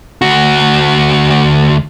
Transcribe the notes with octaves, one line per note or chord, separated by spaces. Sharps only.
D2 F#4